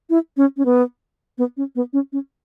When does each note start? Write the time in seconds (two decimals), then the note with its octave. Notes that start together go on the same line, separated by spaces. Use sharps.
0.10 E4
0.37 C#4
0.57 C#4
0.65 B3
1.38 B3
1.57 C#4
1.75 B3
1.93 C#4
2.12 C#4